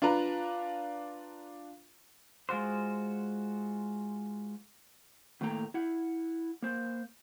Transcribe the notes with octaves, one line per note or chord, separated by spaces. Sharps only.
D4 F4 B4 A#5
G#3 F4 F#4 C5
A2 D#3 A3 A#3 G5 A#5
E4 F#5
A#3 C5